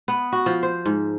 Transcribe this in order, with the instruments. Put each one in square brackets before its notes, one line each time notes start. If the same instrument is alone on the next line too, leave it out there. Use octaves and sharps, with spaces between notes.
[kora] B3
F#4
F3
C5
G#2